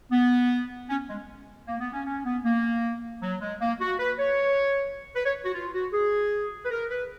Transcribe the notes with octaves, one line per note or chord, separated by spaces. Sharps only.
B3
C#4
G#3
A#3
B3
C#4
C#4
B3
A#3
F#3
G#3
A#3
F#4
B4
C#5
B4
C#5
F#4
F4
F#4
G#4
B4
A#4
B4